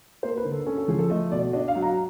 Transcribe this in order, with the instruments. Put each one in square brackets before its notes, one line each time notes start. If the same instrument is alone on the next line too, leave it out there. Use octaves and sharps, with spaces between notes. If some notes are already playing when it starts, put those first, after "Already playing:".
[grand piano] A#3 C5
B4
D3
A4
C#4 A4
A4
F3 G#4
A4
A3 D#5
B2 D5
D4 D#5
F5
F#3
A#5